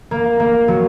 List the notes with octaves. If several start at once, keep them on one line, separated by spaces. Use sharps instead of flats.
A#3
A#3
F#3